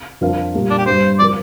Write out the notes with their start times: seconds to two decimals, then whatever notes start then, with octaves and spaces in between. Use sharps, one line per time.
0.21 F2 F3 D4 A#4 F5
0.54 A#2 G3 A#3 F4
0.70 D4
0.78 G4
0.86 G2 G3 C4 C5
1.19 F3 C4 A#4 D5